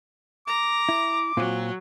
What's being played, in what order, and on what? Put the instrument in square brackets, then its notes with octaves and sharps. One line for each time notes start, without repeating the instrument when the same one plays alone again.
[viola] A#5 [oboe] D6
[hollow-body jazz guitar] E4
[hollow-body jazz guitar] A#2 C4 F4 [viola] F#3